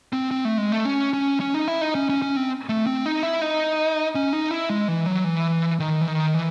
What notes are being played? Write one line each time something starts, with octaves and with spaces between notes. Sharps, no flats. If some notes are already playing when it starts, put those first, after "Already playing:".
C4
C4
A3
G#3
A3
C#4
C#4
C#4
D#4
E4
D#4
C#4
C#4
C#4
C4
A3
C4
D#4
E4
D#4
C#4
D#4
E4
G#3
E3
F#3
E3
D#3
E3
D#3
E3